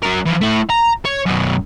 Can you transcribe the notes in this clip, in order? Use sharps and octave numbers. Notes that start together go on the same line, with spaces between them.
F#3 A#4
E3 F3
A3 E4
A#5
C#5
F#2 B2